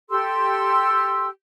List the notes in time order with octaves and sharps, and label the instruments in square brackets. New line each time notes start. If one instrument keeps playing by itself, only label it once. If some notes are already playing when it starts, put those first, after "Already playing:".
[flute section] G4 A4 C6 E6